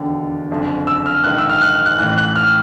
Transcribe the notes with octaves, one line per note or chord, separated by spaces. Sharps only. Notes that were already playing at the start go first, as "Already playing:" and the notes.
Already playing: E1 D#2 D3
F#1 F2 D3
E6
F6
A#1 G#2 D#3 F#6
E6
F6
F#6
F6
F#6
A1 A2 E3 F#6
F#6
F6